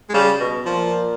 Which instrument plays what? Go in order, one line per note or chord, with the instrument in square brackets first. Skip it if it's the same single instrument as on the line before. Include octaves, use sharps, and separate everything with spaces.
[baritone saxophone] G#3
[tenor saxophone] C#3 [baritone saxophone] G3
[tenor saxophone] B2
[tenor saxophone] A#2 [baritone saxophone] F3